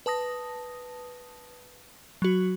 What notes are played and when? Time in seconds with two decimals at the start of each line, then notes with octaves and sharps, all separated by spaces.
0.06 B4 A5 D#6 A#6
2.22 F#3 F#4